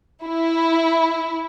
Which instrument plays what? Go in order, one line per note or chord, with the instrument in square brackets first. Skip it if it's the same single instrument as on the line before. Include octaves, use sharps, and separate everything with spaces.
[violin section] E4